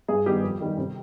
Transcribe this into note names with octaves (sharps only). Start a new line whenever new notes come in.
G2 G#4
D#3 G3 B3 G4
F2
D#3 G3
C3